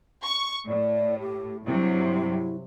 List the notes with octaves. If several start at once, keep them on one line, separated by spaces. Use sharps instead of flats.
C#6
A2 D5
G4
G2 C3 F#3 E4